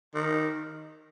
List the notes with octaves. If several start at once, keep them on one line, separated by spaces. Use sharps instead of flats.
D#3